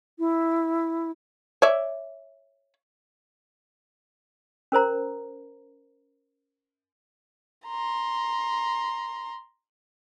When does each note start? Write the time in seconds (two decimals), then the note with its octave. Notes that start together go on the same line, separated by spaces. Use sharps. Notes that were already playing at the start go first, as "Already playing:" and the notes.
0.19 E4
1.62 C#5 D5 E5
4.72 C#4 A#4 C5 A#5
7.67 A#5 C6